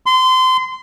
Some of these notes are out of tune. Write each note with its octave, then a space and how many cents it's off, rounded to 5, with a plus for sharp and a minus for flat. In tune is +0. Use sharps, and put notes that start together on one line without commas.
C6 -25